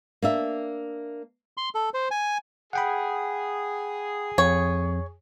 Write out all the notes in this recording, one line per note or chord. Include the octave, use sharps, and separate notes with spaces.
A#3 D4 E5
C6
A4
C5
G#5
G#4 F#5 G5 B5
F2 C#5